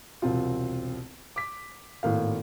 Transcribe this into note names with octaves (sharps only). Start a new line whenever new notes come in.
E1 C2 C4 F4
D6 B6
G#1 A2 A#3 F5